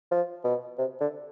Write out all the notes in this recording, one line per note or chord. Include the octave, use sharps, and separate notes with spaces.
F3
B2
C3
D3